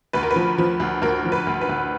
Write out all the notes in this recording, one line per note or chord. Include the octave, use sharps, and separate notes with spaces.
D2 B4
A#4
B4
F3
F3
D2
D2 A#4
F3
B4
D2
B4
D2